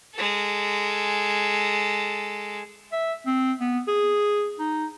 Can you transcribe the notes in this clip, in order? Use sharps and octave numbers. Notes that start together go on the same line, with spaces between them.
G#3 A4
E5
C4
B3
G#4
D#4